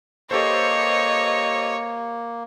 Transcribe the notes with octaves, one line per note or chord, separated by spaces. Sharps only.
A#3 G4 A4 C5 C#5 D#5